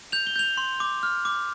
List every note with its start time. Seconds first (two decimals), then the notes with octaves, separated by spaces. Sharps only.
0.12 G6 F7
0.27 G7
0.36 G6 F7
0.57 C6
0.80 D6
1.03 F6
1.25 D6